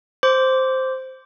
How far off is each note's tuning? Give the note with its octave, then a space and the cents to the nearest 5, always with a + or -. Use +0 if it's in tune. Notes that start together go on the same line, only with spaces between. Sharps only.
C5 +0 D6 -15